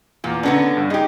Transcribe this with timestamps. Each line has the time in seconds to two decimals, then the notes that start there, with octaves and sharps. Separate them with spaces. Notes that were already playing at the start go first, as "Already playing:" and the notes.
0.24 E2 A#2
0.43 D3 B3 C#4 D4 A#5 A#6
0.77 G2
0.90 D#4 G4 G#4